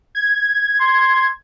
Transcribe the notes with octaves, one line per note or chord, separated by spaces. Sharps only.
G#6
C6